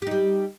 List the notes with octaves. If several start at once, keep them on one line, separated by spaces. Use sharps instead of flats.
G3 D#4 G4